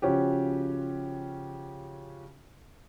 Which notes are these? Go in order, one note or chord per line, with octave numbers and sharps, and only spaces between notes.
C#3 F3 C#4 F#4 G4